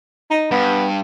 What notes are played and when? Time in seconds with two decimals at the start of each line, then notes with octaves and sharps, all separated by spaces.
0.30 D#4
0.51 G2 B3